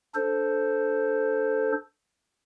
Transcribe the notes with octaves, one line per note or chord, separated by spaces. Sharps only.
D4 A4 C5